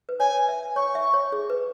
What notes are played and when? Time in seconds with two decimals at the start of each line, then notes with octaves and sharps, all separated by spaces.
0.09 B4
0.20 C#5 G#5
0.48 E5
0.76 C#5 C#6
0.95 E5
1.14 C#5
1.32 G#4
1.50 B4